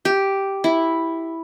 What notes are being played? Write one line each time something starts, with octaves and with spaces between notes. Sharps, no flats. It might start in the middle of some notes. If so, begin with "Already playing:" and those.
G4
E4